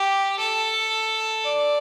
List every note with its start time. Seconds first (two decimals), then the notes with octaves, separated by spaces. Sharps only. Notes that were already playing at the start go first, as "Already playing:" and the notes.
Already playing: G4
0.39 A4
1.45 D5